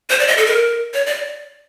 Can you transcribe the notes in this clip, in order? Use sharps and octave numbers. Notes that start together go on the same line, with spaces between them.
C5
D5
D#5
A4
A#4
C#5
D5